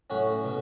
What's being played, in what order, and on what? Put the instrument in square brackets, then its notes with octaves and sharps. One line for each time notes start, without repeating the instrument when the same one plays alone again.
[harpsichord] A2 F#3 C#4 F#4
B2